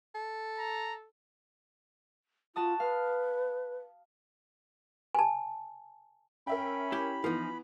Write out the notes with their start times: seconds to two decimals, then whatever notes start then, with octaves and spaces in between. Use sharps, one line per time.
0.15 A4
0.58 A#5
2.56 F4 F#4 A5 D#6
2.80 B4 F5
5.15 G#5 A5
6.47 C#4 A#4 E5 G5 B5
6.92 E4 G4
7.24 E3 F3 B3 D#4